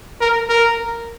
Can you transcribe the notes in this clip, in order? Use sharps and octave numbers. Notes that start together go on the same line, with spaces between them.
A#4
A#4